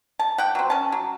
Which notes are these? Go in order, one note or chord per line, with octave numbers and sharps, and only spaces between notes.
A5
F#5 G5
F#3 C4
C#4 A5
F#3